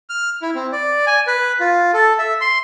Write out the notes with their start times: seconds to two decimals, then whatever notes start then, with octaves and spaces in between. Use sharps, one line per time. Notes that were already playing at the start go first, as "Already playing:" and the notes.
0.09 F6
0.42 E4
0.55 C4
0.72 D5
1.07 G#5
1.27 B4
1.60 F4
1.94 A4
2.19 E5
2.41 C6